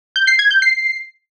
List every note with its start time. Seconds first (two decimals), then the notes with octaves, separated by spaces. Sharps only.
0.16 G6
0.27 C7
0.39 G#6
0.51 G6
0.62 C7